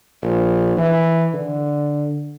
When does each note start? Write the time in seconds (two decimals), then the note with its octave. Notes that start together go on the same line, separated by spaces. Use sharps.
0.23 A#1
0.77 E3
1.34 D3